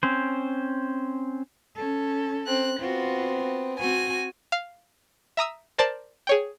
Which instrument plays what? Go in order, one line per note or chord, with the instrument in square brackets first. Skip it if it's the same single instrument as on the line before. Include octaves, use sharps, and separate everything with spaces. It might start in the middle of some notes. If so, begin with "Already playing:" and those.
[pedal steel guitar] C4 C#4 C5
[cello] C#4 A4
[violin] C4 F#6
[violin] B3 C4 [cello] F4 F#4
[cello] C4 F#4 [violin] G#5
[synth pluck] F5 F6
E5 A#5 D#6 E6
A#4 C5 D5 A5
G#4 C#5 G5